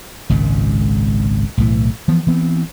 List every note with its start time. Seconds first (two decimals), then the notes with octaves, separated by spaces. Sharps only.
0.29 G#1 C#2 A#2
1.57 B1 A2 E3
2.08 E3 F3 B3
2.27 E3 B3 C4